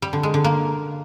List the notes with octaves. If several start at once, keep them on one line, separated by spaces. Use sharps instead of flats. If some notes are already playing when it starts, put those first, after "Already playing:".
G3
D3
G#3
D3
A#3